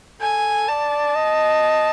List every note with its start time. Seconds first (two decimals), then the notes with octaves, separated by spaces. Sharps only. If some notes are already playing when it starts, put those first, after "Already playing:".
0.21 A4 G#5
0.68 D5 A5
1.16 D#5